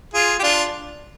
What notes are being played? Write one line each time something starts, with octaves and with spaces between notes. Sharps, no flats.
F4 G#4
G4
D4 F4